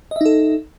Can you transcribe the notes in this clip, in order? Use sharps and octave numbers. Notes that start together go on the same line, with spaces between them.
D#4 A4 D#5 E5